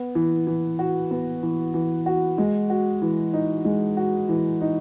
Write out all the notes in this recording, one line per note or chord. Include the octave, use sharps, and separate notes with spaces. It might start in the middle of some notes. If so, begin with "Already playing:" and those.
Already playing: B3
E3
E3
F#4
B3
E3
E3
F#4
G#3
F#4
E3
D#4
G#3
F#4
E3
D#4